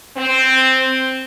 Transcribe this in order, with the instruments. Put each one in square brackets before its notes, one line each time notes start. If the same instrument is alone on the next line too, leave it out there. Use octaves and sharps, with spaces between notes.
[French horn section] C4